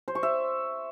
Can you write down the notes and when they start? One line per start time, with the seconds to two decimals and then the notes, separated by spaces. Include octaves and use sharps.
0.08 C5
0.15 C#6
0.23 E5